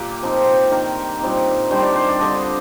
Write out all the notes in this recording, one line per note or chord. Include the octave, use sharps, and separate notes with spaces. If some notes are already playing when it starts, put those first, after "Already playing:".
Already playing: A#2 A#3 G4
F3 C4 D#4
D#3 A#3 D4 A#4
A#2 G3 C4 D#4
D#3 G3 D4 C5
D5
C5
D5
D3 G3 D4 D#5
D#5